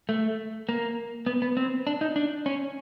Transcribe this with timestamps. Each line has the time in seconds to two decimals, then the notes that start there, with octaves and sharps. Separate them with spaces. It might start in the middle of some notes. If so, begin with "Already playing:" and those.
0.09 A3
0.69 A#3
1.27 B3
1.42 B3
1.57 C4
1.87 D4
2.01 D#4
2.16 D4
2.46 C#4